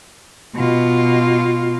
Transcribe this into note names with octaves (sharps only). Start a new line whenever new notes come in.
B2 F4